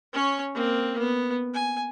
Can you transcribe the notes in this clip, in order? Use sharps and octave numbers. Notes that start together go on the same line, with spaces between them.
C#4 C#5
A#3 C4
B3
G#5